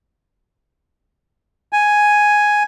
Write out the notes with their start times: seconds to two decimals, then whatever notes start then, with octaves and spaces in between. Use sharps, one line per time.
1.73 G#5